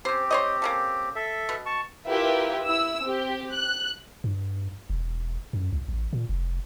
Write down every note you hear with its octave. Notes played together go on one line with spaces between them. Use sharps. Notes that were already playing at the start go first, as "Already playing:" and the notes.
C4 C#4 G4 C5
C5 C#5 D#5
A#3 C#4 A4
A4 E5
B2
A5 C#6
E4 F4 G4 A#4 B4 E5
E4 E6
C4 G4
F#6
G2
E1
F#2
C2
A1
A#2
F1